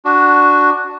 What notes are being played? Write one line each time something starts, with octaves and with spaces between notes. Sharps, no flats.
D4 F#4